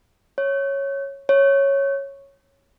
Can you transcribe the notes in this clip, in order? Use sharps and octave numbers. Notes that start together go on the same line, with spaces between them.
C#5
C#5